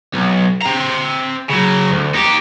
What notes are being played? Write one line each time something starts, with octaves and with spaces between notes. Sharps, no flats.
B1
C4 A#5
C#3 F#3
D2
D#4 G4